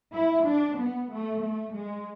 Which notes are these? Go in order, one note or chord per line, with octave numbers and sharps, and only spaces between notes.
E4
D4
B3
A3
A3
G#3